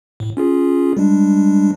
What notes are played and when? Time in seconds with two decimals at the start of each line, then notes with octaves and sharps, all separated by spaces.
0.20 A2
0.37 C#4 F4 G#4
0.97 G3 G#3 D4